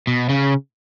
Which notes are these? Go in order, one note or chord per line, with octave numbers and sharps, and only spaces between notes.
B2
C#3